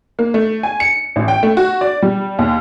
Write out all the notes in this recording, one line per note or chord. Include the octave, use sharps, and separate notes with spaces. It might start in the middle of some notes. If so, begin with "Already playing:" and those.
A#3
A3
G#5
C#7
A1
G5
A3
F#4
D5
G3
D#2